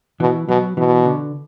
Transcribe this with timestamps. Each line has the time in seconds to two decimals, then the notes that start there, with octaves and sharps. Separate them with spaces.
0.20 B2 E3
0.48 B2 F#3
0.77 B2 E3
1.06 D3